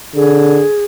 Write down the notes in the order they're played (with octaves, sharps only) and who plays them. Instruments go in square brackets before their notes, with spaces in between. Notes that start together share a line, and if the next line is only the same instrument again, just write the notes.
[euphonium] D3 [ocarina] G#4